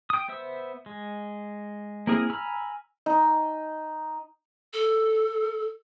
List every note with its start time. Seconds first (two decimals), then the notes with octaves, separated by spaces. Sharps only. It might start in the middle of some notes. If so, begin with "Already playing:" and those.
0.10 G5 D#6
0.28 B3 C5 E5 E6
0.86 G#3
2.07 A#3 C4 E4 G#4 A#4
2.30 G#5 A#5 B5 E6 F6
3.06 D#4
4.73 A4